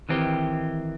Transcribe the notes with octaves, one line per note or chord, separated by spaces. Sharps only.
D#3 E3 C4 G4